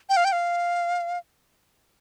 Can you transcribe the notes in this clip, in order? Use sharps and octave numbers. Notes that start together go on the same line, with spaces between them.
G5
F5
G5
F5